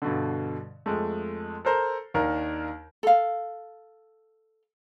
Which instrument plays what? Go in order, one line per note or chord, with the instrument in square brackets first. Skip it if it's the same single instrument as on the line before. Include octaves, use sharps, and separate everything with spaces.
[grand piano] G2 B2 D3
F2 G#3 A3
A4 A#4 C5 A#5
D#2 D#3 D4 A#4
[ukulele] A4 F5